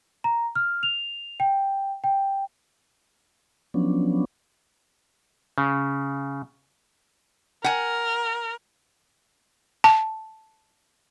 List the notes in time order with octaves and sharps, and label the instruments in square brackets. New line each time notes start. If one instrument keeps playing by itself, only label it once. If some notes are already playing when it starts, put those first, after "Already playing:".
[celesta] A#5
F6
F7
G5
G5
[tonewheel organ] F3 F#3 B3 C#4 D4
[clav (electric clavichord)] C#3
[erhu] A#4 [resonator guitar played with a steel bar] F#5 G#5
[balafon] A5